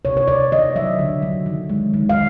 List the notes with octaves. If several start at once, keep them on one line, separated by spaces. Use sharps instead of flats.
C3 C#5
C#5
C3 D5
D#3 D#5
F#3 E5
D3
F#3
D#3
G#3
D#3
F5